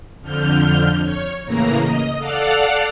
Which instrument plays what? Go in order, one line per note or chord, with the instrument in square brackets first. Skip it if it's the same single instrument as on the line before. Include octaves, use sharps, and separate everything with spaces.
[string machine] F2 D3 F6 G6
C#5
A2 C#3 E3 A#3 A#5
D#5
A4 D5 F5 F#5 F6 F#6